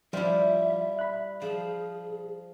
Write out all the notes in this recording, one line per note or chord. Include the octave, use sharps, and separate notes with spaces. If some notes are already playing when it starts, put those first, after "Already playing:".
F3 G3 E4 F4 E5 F5
B5 F#6
F3 G#4